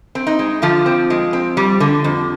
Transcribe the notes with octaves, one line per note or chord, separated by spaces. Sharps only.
C4
D#4
G#3
D3 F3 F4
C4
G#3
C4
G3
D3
F2